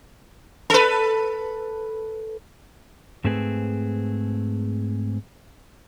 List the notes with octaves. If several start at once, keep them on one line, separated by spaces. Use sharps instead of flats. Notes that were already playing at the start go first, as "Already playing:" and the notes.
A4 B4
G#2 A3 C4 G#4 B4